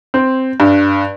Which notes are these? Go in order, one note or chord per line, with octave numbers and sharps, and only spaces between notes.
C4
G2